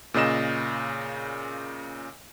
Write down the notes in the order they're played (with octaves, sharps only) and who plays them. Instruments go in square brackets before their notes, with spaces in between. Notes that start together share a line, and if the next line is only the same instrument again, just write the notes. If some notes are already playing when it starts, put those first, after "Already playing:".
[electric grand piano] A#2 C#3 D#5 E7